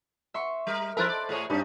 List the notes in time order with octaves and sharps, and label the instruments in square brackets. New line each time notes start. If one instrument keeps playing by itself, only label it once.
[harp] E5 C6 C#6
[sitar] G3 A#4
[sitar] F3 E4 A#4 [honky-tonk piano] A4 C5 [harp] B5 F#6 A6
[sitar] D5
A2 G#4 C#5
[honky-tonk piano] G2 D4 [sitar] C4 D#4